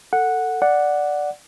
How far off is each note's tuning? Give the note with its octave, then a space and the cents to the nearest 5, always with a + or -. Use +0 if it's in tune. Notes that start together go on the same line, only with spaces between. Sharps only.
A4 +20 F#5 -5
D5 +0 F#5 +0